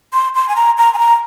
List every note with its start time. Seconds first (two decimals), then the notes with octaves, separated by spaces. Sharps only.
0.14 C6
0.35 C6
0.49 G#5
0.56 A#5
0.78 A#5
0.94 G#5
0.98 A#5